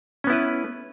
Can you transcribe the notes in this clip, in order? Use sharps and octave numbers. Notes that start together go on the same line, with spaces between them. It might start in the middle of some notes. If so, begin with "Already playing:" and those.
B3 C#4 E4 B4